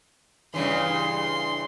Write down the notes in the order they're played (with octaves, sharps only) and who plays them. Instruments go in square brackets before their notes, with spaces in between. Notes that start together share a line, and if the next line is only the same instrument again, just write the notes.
[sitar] G2 C#3 E3 [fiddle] C6